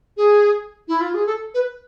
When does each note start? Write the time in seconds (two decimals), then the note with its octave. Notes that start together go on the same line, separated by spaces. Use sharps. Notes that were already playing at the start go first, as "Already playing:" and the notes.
0.17 G#4
0.88 E4
1.01 F4
1.14 G#4
1.26 A4
1.54 B4